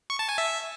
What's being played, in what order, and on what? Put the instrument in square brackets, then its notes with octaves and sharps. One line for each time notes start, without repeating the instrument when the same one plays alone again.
[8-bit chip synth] C#6
A5
G#5
E5